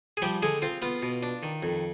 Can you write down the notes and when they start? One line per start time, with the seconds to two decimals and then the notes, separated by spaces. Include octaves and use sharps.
0.17 G#4
0.22 F3 G3 G4
0.42 D3 G#3 G#4
0.62 C4 F4 F5
0.82 B3 F4 F5
1.02 B2
1.23 D4
1.43 D#3
1.63 F2